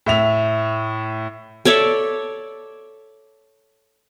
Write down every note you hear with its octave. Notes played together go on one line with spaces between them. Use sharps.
A2 E5 F7
A4 C#5 D5 E5